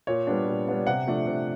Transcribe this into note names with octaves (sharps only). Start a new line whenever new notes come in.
A#2 C#5
G3 B3 D4
A#2
G3 B3 D4
C3 F#5
F3 A3 D4
C3